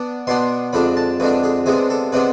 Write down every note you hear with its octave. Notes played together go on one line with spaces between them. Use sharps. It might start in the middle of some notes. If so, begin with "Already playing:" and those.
Already playing: B3 D4
B2 B3 D4 C6
F2 D3 G#3 D4 B5
A5
F2 D3 G#3 D4 B4
G#4
C3 G#3 B3 D4 G#4
A4
C3 G#3 B3 D4 B4